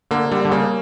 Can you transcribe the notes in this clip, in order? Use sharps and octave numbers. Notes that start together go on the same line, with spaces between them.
D3 A#3
D3 G3
D3
C#3 A#3